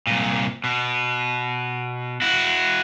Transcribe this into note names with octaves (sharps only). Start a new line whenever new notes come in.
C2 A#2
B2
E4 F#4